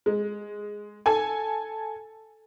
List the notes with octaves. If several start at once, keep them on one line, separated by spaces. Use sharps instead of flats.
G#3
A4 G#5